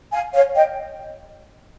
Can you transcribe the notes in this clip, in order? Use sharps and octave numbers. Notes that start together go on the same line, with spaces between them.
F5 G#5
C#5 F5
D#5 G5